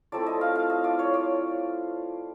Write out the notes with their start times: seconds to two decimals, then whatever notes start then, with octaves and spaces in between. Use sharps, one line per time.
0.12 F3 A3 C4 E4 D5
0.26 D#5
0.41 F5
0.55 F5
0.70 D#5
0.84 D5
0.99 C#5
1.14 D5